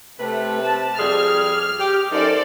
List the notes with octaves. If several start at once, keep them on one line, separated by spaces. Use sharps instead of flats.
C3 A3 B4
A5
F2 G3 G#4 F6
G4
F#2 D#4 A4 C5 D5